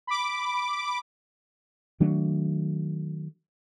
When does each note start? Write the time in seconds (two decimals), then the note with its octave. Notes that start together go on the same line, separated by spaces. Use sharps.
0.07 B5 D6
2.00 D#3 F#3 A3 D4